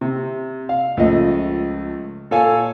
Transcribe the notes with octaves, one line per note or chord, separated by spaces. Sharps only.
C3
F5
C#2 F3 A3 D#5
A#2 A4 C#5 F5 G#5